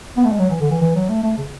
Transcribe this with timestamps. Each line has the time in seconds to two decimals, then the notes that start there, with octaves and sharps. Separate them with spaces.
0.17 B3
0.25 A3
0.32 G#3
0.39 F#3
0.50 E3
0.60 D3
0.71 E3
0.81 E3
0.95 F#3
1.09 A3
1.23 A3
1.38 C#3